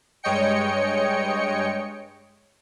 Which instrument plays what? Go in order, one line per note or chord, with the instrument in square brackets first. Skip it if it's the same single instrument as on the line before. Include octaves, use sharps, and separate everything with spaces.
[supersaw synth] G2 G#3 C#5 D#5 G5 C#7